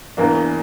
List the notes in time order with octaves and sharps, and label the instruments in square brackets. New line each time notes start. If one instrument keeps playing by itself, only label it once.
[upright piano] E1 E2 E3 A#3 D4